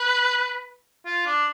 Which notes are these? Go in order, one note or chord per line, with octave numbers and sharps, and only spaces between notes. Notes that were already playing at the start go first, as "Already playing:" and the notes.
Already playing: B4
F4
D4